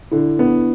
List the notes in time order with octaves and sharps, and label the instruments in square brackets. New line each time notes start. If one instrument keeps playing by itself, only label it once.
[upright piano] D3 [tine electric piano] E4
[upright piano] B3 [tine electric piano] D4